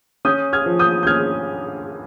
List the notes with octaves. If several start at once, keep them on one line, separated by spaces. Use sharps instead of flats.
C#4 D#6 G6
F6 G#6
F3
D#6 G6
G6
C#4 F6 G#6